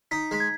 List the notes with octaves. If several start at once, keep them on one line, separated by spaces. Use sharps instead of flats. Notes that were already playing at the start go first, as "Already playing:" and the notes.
D#4 B6
G#3 B6
G#6